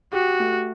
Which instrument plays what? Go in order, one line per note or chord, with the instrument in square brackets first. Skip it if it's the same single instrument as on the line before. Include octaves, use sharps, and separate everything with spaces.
[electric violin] F#4 [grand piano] G4
[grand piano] A3